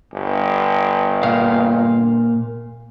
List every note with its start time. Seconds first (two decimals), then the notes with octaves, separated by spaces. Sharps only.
0.13 G1
1.23 A#2 F5